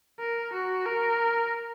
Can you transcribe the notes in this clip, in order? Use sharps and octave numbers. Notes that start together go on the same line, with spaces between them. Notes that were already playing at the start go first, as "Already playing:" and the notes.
A#4
F#4
A#4